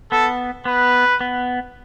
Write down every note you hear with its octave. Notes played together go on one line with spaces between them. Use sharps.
B3 A4
B3 B4
B3